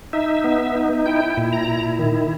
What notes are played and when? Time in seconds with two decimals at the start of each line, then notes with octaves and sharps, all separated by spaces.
0.13 D#4 E5
0.44 B3
0.75 D#4
1.06 E4 G5
1.37 A#2
1.53 A#5
1.68 E4
1.99 D#3